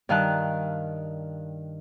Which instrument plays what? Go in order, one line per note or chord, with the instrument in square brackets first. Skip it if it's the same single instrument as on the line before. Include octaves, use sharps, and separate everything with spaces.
[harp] G2 D#3 F5 A5 F#6